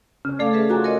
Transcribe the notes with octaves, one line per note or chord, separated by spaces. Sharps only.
C#3 C#4 C#5
A3 A4 D5 F5
G#4 B4 E5
F4 F#4 G#4 G#5 A#5 F#6
A#4 C#5 D#5